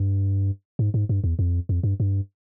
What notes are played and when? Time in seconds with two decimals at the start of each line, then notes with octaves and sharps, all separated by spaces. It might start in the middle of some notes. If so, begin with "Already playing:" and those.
Already playing: G2
0.79 G#2
0.94 G#2
1.09 G2
1.24 E2
1.39 F2
1.69 F2
1.83 G2
2.00 G2